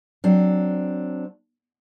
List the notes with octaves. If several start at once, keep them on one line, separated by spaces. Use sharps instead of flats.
F#3 C4 D4